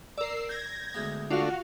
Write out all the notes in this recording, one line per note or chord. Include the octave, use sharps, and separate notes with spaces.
A#4 D5 E6 C7
G6 G#6 A#6
D2 G#3 B3
D3 A3 D4 F4 F#4 F5